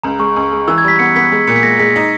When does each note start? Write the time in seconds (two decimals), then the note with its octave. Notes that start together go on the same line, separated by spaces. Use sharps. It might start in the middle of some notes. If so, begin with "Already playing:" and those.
0.04 C#2 A#5
0.19 G#3 C#6
0.36 C#2
0.52 G#3
0.68 E3 E6
0.78 G#6
0.84 G3 B6
0.99 B3 C#7
1.16 B3 B6
1.32 G#3
1.47 A#2 C#7
1.56 B6
1.63 G#3 A#6
1.79 G#3 B6
1.96 D#4